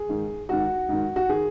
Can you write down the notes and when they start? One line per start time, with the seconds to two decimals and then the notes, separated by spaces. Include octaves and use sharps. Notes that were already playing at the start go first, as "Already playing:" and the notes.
Already playing: G#4
0.09 G#2 D#3
0.49 G#2 D#3 F#4
0.89 G#2 D#3
1.16 F#4
1.29 D#3 G#4